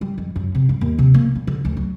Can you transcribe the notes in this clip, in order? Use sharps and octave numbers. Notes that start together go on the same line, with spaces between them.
G3
F2
F#2
C3
G2
D#2
C3
A#3
G3
D3
D2
F#3